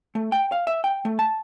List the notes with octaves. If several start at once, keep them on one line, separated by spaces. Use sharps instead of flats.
A3
G5
F5
E5
G5
A3
A5